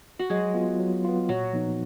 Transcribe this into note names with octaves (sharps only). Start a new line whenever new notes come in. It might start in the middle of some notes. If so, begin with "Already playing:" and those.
F#4
F#3 G#3 G#4
B3 F4
F#3
B3 F4
A#2 F#3 F#4
F3 B3 D#4